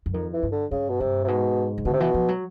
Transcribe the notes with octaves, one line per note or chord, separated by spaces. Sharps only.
F#2
F2 D#3
E3
G2
D3
G2 C#3
B2
G2 C3
C3
G#2 B2
C#3
B2 D3
C3
B2 E3
F3
F#3